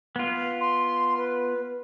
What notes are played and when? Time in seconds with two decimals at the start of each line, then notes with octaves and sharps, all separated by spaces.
0.16 B3 F4
0.61 C6
1.17 B4